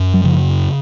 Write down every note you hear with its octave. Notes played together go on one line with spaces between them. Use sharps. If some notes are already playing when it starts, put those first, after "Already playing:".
Already playing: F#2
F#3
C#3 F3